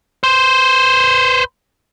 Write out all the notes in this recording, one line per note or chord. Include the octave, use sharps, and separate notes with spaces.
B4 C5